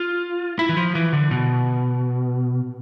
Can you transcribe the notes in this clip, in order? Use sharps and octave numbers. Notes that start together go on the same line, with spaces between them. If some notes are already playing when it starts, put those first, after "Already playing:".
Already playing: F4
E4
E3
F3
E3
D3
B2